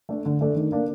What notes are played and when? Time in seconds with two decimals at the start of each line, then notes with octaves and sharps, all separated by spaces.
0.09 A3 D4 A4
0.25 D3
0.41 A3 D4 A4
0.56 D#3
0.72 A#3 D4